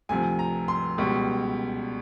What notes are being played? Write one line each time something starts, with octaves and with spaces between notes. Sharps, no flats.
D2 C3 F3 G#5
A#5
C6
C#2 B2 G3